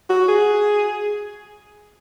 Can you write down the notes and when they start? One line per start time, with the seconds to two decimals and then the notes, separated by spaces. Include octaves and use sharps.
0.10 F#4
0.28 G#4